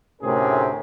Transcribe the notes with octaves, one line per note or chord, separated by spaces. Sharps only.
D2 A2 C3 C#4 G#4 A#4